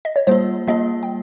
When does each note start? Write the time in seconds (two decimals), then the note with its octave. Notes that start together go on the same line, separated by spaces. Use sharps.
0.05 D#5
0.16 C#5
0.27 G3 A#3 F4 C5
0.68 G3 A#3 F4 D#5
1.03 G5